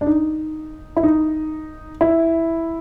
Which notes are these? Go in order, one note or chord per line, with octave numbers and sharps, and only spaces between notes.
D4
D#4
E4
D#4
E4